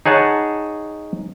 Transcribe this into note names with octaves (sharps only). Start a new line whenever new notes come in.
D#4 G#4 C#5 F#5 A5